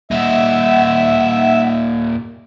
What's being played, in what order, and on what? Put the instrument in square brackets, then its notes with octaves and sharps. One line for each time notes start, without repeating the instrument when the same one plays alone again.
[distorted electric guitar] A#2 D#4 [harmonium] E5 [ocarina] F#5